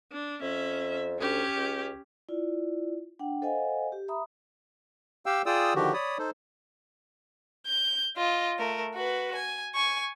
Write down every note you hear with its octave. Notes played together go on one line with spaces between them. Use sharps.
D4
F2 C#4 E5
D2 C#4 G4
C#2
E4 F4 D5
D4 F#5 G5
A4 C5 D#5 F5 F#5 G#5
G4
E5 A#5 B5 D#6
G4 F5 G5 E6
F4 G#4 D5 G5 D#6 E6
D3 D#3 F3 F#4 G4
C#5 D5 B5 D#6
D#4 A4 C5
G6
F4 D#5
A3 A#4
F#4 B4
G#5
G#5 C#6